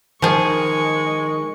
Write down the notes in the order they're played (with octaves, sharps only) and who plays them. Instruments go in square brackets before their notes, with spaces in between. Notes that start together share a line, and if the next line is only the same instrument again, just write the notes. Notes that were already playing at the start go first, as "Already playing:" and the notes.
[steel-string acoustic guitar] D#3 [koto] F3 G#4 [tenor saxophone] G#3 [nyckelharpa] C#6